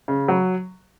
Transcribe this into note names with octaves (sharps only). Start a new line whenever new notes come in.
C#3
F#3